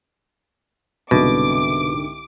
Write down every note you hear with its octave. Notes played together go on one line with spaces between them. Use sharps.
C2 G#2 B2 D3 D6